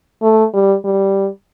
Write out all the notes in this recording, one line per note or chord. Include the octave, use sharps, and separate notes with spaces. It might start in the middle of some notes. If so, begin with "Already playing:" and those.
A3
G3
G3